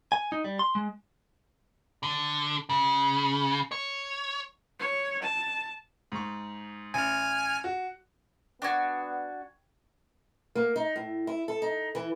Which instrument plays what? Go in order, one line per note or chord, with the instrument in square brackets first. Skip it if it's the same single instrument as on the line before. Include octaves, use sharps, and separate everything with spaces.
[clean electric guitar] G#5
D#4
G3
C6
G#3
[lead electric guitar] D3
C#3
C#5
[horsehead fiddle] C#5
A5
[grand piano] G#2 C#6
[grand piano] A1 [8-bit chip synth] G#5 F6
[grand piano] F#4
[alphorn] B3 [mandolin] D4 F#4 [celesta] G5 C#6 G#6
[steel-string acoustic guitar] A#3
D#4
A2
E4
A4
D#4
E3